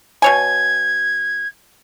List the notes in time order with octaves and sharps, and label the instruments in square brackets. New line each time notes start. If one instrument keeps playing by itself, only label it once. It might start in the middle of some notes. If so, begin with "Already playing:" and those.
[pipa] B2 C#5 G#5 [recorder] G#6